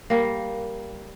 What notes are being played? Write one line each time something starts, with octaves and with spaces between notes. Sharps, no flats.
G3 A#3